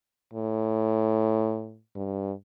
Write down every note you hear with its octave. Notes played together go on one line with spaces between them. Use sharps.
A2
G2